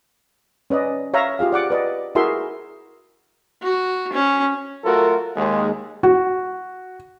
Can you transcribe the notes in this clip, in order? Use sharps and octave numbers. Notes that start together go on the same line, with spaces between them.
C#4 B4 D5 D#5
C#5 E5 F5 A#5
F4 G4 G#4 F5
D5 F#5 D6
B4 D5 D#5
E4 F#4 G#4 A#4 E5 C6
F#4
C#4
F#3 A3 F4 F#4 A4 A#4
D#2 G#3
F#4